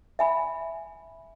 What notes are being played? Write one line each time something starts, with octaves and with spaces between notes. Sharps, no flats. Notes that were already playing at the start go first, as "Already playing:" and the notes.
E5 G#5 B5